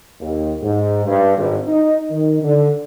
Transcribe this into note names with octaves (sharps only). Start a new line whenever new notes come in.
D#2
G#2
G2
G#1
D#4
D#3
D3